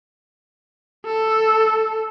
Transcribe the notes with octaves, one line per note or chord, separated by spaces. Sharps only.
A4